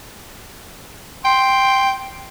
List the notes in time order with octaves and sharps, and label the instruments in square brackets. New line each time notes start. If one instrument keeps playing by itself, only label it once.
[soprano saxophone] G5 [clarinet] C6